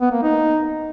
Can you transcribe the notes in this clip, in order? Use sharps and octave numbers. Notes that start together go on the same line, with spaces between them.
B3
A#3
D#4